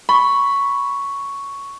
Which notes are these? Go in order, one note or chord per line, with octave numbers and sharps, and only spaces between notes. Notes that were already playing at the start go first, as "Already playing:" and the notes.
B5 C#6